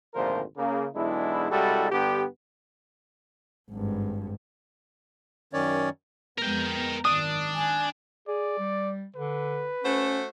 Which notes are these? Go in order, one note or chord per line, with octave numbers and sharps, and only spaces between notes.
G#1 D2 A#2 F3 A#4 C5
C#3 A#3
B1 E2 G#3 D4 E4
C2 G3 G#3 E4 F#4 A4
G2 D3 B3 G4
G#1 G2
F#2 D#3 C#4 C#5 D5
F2 G#3 B3 A#4 G5
G#1 F#2 D#3 D4 D#6
G#5
G#4 D5
G3
D3 B4
A3 C#4 F#4 C5